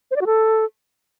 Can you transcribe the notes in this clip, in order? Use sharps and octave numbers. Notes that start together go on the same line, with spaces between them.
C5
D5
F#4
A4